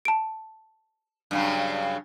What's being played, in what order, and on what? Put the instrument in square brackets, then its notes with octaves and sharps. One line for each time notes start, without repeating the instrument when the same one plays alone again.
[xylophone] A5 D7
[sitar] G2 C#3 F#3